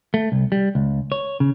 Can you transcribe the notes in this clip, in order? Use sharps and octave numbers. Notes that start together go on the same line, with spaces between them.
A3
C2
G3
C#2
C#5
C#3